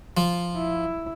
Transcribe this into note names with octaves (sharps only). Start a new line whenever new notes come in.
F3
E4